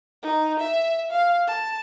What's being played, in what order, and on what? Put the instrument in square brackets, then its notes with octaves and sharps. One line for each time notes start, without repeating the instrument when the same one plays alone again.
[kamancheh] D#4
E5
F5
A5